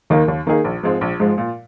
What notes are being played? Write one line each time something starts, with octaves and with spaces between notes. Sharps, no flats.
D#2 D#3 A#3 D#4
D#2
D#3 A#3 D#4 G#4
A#1
G#2 F3 G#3 C4
A#1
G#2 F3 G#3
A#2